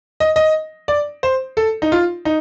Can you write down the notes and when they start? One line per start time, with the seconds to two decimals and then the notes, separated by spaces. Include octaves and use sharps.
0.20 D#5
0.36 D#5
0.88 D5
1.23 C5
1.57 A4
1.82 D#4
1.92 F4
2.25 D#4